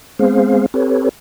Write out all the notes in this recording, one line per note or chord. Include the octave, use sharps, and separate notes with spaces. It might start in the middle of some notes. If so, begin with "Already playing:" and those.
G#3 B3 C4 G#4 C5 F5
C4 G4 A4 B4 C#5